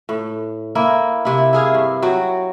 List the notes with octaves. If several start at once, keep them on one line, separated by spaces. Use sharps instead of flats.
A2
A#3 E4 A#4
C3 E4
E4 G#4 F5
G2
F#3 F#4 G5